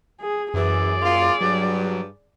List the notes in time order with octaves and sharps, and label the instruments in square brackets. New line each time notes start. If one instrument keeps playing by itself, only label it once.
[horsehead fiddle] G#4
[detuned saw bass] F#2 [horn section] E3 [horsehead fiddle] G#4 D5
[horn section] A#3 F4
[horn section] G2 [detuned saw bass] F#3